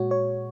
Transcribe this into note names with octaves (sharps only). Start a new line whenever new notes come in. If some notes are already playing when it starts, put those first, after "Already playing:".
Already playing: A#2 G#3 F#4 C#5
C#5